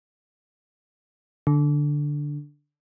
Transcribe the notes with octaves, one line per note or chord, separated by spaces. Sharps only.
D3